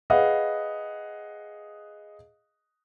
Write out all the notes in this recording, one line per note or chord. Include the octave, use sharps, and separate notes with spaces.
G#4 B4 D#5 F5 F#5